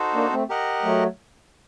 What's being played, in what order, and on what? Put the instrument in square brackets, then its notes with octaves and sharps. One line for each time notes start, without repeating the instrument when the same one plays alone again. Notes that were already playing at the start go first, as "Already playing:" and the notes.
Already playing: [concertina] D#4 F#4 A4 C5
[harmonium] A#3 D4
A3 C4
[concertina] G4 A#4 D#5 F#5
[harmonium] F#3 A3